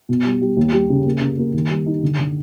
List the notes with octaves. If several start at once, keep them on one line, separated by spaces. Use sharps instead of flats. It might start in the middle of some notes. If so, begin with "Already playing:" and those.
B2
G3
G3
D#2
G3
C#3
A#3
C#3
A#3
D#3
G3
D#4
D3
D3